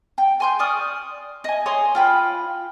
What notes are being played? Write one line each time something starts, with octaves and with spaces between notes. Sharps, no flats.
G5
G#5 C6 G6
D5 C#6 D#6 F6
D#5 G#5
C#5 G#5 C6 D#6
F4 G5 B5